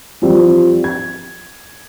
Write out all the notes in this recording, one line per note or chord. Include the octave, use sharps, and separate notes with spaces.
E3 F3 G3 C4
G#6